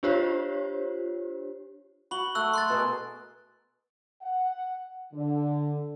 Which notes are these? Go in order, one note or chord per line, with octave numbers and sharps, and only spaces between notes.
D4 F4 G4 C5 C#5
F#4 B5 F#7 G7
A3 E6 F#6
C6 F#6 A6
B2 G#4 A#4
F#5
D3